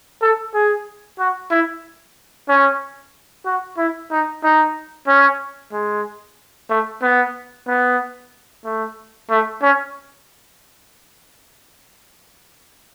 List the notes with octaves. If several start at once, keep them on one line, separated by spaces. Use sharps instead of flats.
A4
G#4
F#4
E4
C#4
F#4
E4
D#4
D#4
C#4
G#3
A3
B3
B3
A3
A3
C#4